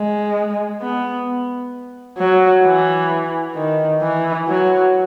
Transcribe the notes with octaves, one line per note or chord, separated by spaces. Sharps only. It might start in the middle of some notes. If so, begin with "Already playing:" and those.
Already playing: G#3
B3
F#3
E3
D#3
E3
F#3